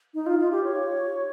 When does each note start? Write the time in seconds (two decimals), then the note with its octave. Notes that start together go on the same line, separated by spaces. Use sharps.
0.14 D#4
0.26 F4
0.39 F4
0.51 G4
0.64 C#5